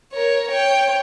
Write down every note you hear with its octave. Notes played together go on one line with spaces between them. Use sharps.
A#4 C#5
C#5 G5